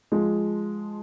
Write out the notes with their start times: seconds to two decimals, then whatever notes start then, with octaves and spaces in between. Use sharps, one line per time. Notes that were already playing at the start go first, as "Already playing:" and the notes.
0.12 F3 G#3